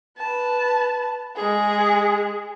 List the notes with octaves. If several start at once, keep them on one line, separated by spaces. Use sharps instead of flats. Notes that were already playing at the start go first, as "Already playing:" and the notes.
B4 A5
G#3 G#4